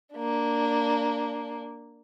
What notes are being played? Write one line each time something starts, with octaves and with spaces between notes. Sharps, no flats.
A#3 D4